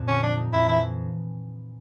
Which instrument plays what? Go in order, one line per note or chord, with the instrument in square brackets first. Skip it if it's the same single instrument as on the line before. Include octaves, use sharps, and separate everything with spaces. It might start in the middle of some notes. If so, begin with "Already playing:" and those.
Already playing: [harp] F2 A#2
[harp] D3 [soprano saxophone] C#4
[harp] F3 [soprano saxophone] D4
[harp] D#4
[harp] F2 [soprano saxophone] E4
[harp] E3 [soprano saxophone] E4